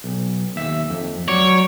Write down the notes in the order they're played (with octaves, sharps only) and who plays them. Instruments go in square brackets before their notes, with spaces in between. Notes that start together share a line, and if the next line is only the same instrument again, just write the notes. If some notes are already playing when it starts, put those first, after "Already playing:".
[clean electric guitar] B1
D#2 E5
F2
[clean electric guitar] F#3 D5 [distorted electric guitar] C#5